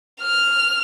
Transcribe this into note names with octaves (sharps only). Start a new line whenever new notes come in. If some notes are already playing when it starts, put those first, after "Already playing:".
F6